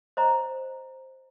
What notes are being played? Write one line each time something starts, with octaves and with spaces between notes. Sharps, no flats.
C5 D#5 A#5